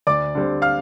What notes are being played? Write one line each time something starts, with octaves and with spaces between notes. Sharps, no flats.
D2 D5 D6
D3 G3 C4
F5 F6